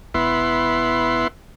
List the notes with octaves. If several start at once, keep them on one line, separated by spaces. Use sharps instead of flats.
E1 B3 E4 C6